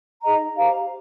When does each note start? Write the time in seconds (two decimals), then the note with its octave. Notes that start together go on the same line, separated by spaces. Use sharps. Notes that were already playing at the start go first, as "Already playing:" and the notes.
0.21 D#4 G#4 D#5 A#5
0.55 G4 C5 F5 A#5